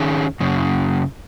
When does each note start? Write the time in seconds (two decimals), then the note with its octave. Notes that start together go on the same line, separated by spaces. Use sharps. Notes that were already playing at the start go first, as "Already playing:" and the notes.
Already playing: D#3 C#4 G#4
0.40 F#2 C#3